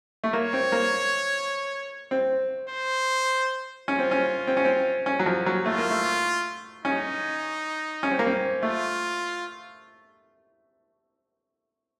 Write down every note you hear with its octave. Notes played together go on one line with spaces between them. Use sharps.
A3
A#3 C#5
C4
A#3
C4
C5
C#4 F4
C4
C#4
C4
C#4
C4
C#4
F#3
F3
F#3
A3 F4
A#3
A3
C#4 D#4
C#4
C4
A#3
C4
A3 F4